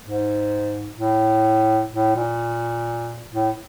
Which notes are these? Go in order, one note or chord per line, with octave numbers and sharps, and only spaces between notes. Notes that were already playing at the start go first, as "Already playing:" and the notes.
G#2
A2
A2
A#2
A2